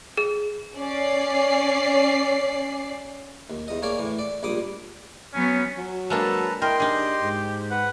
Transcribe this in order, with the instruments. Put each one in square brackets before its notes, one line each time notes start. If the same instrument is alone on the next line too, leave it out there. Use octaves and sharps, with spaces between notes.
[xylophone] G#4
[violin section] C#4 D5 C7
[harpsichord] D#2
E2 D#5
A#3 G#4 C#5 D5 F5
A2 E3
D5
A#1 G3 D6 D#6
[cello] F#3 B3 [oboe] C#4
[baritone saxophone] F#3
[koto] G#3 A#3 D4 [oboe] A4 [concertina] B4 A5 A#5
[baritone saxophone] E4 [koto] A#4 [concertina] D#5 C6 [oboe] G5
[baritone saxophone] D4 [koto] D#4 G#4 [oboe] G4
[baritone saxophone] G#2
[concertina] B4 [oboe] F#5